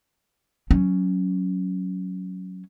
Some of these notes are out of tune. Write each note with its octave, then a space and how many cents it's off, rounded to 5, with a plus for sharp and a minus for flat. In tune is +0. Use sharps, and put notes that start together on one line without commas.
F#3 +0 C#4 +0